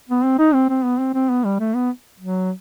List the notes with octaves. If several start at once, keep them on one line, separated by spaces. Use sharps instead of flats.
B3
C4
D#4
C4
C4
B3
C4
C4
B3
G3
A3
B3
F#3